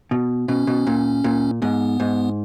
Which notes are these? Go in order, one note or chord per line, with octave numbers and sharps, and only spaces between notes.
B2
B2 C#4
B2
A#2
A#2
G#2 B3
G#2